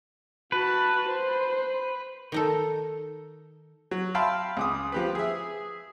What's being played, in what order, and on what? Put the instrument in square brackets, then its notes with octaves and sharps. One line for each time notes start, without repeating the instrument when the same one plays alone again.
[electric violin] F#4 A5 [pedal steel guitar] B4
[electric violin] C5
[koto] D#3 D#4 A4
[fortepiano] F#3
E5 F5 G5 A5 B5 C6
C#2 D6 D#6
F3 G4 B4
G#4 E5